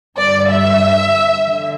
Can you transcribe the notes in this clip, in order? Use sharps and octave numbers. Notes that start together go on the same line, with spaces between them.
G2 D3 D5
E5
D3